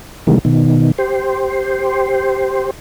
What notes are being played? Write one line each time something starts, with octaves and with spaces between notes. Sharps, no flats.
C3 D#3 E3 G3 G#3 A#3
B2 D#3
G4 C5